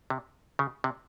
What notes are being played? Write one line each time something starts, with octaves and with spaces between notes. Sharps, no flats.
C3
C#3
C3